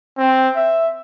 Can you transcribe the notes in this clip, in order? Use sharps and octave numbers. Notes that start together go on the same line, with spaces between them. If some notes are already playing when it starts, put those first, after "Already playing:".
C4
E5